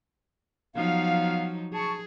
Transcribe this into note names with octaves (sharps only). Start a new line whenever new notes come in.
F3 F#3 B3 D#4 F5
G#4 A5 C#6